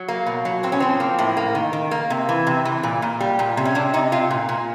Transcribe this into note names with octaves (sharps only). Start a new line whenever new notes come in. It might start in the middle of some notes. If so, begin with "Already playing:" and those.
Already playing: F#3
A#3
B2
F#3
A2 C4
C#4
F3 C4
A#3
A2
A#3
D#3
D#3
A#3
C3
E3
C3
E3
A#2
A#2
G3
A#2
C3
C#4
C3 D4
C3 D#4
C3 F4
A#2
A#2